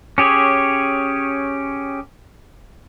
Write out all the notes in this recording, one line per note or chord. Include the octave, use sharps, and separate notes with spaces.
C#4 G4 G#4 C#5